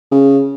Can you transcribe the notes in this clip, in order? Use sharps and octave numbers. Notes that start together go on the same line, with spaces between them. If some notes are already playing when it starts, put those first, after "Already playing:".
C#3